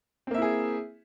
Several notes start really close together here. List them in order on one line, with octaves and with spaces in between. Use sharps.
C4 A#3 E5 E4 G#4